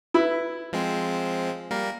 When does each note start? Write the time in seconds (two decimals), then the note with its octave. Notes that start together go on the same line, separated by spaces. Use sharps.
0.14 E4 B4
0.73 F3 G#3 C4
1.71 G3 A#3 A#4